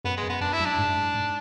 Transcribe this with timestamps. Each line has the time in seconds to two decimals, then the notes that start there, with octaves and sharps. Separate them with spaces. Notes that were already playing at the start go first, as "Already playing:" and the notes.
0.04 F#2 B3
0.17 G#3
0.23 F#2
0.29 B3
0.41 F#2 D4
0.53 E4
0.60 F#2
0.65 D4
0.78 G#2
0.96 G#2
1.15 G#2